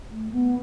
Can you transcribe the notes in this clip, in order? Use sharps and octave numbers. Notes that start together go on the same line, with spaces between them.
A3
B3